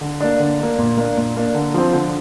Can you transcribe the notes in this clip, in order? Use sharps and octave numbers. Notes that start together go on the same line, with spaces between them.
D3
A#3 D4
D3
A#3 D4
A#2
A#3 D4
A#2
A#3 D4
D3
F3 C4
D3